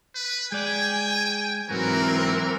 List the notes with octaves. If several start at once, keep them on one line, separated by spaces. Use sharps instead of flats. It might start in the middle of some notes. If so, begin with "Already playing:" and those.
B4
G#3 D5 G5 G#5
G#2 E3 F#3 C4 F#4 A#4